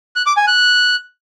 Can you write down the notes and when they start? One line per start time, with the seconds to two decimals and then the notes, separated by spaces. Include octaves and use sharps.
0.16 F#6
0.26 D6
0.37 G#5
0.47 F#6